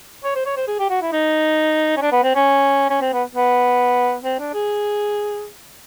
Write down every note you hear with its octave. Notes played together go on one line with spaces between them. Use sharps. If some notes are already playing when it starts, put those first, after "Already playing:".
C#5
C5
C#5
C5
G#4
G4
F#4
E4
D#4
C#4
D4
B3
C4
C#4
C#4
C4
B3
B3
C4
D4
G#4